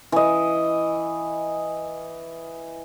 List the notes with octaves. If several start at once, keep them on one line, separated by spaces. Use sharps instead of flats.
E3 D#5